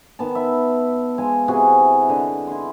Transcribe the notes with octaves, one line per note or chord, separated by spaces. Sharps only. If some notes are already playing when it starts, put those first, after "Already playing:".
D#3 B3 A5
E5 B5
G#3 F5 G#5
C3 E4 F#4 G#4
D3 D#5
E4 C6